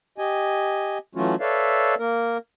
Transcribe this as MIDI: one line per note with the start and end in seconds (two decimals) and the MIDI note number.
0.18 0.98 67
0.18 0.98 75
0.18 0.98 80
1.15 1.35 52
1.15 1.35 54
1.15 1.35 57
1.15 1.35 61
1.15 1.35 65
1.15 1.35 66
1.40 1.95 69
1.40 1.95 71
1.40 1.95 73
1.40 1.95 74
1.40 1.95 76
1.40 1.95 77
1.99 2.37 58
1.99 2.37 70